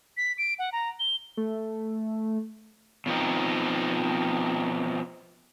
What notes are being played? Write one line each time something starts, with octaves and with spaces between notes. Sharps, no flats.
B6
D7
F#5
A#5
G7
A3
B2 F3 C4 D#4